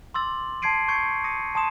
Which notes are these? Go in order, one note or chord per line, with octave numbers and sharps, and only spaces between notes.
C6 D6 E6 A6 F#7
A5 C6 G#6 C7 D7 D#7
C#6 G6 G#6 C7 C#7
D#6 A#6 C#7 D#7
A5 C6 D#6 E7